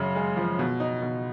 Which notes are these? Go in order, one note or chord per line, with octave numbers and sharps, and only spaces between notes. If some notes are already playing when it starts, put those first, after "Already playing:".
Already playing: F#2 C#3
G#3
F3
B2
D#4
B2